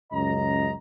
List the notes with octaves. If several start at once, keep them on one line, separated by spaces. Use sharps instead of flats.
C#2 F#2 D#5 A#5